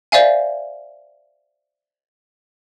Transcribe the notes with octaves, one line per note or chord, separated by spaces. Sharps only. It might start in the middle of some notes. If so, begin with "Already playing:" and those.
C5 D5 E5 F5 G#5